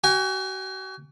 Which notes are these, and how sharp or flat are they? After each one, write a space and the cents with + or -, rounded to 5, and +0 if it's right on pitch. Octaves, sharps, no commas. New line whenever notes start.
F#4 +40 G#5 -30